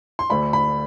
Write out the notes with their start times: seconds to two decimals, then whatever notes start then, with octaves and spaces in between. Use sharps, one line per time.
0.19 C6
0.30 D2 D3 A3 D4 B5
0.53 B5